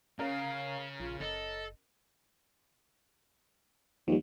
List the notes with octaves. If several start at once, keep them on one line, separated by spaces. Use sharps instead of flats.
C#3 C#4 A#4 F5
A#1 F4
F#1 A4 D#5
D#2 F3 G3